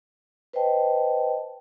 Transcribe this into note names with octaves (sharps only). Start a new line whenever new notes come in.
B4 C5 D#5 G5 A5